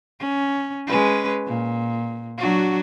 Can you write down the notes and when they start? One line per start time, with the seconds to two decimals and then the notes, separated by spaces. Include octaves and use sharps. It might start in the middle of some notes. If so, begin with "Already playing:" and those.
0.20 C#4
0.86 G#3 C#4 B4
1.46 A#2
2.38 F#3 D4 F#4